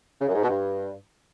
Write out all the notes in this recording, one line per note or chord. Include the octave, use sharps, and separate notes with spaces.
C#3
F#2
G#2
B2
G2